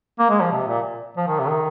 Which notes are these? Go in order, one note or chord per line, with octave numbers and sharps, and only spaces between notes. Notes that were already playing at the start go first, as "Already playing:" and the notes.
A#3
G#3
F3
C3
A#2
F3
D#3
C3
D#3